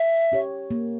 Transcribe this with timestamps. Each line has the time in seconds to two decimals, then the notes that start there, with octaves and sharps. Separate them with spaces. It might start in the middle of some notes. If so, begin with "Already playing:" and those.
Already playing: E5
0.32 C#4 G4 C#5
0.71 A#3